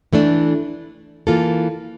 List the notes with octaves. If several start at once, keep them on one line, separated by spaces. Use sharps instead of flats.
E3 A3 D4
E3 A#3 F4 A4